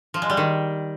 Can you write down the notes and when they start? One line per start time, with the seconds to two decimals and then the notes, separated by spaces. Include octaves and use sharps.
0.14 F3
0.22 G#3
0.30 G3
0.37 D#3